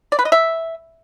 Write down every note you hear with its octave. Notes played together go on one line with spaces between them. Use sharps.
D5
B4
D#5
E5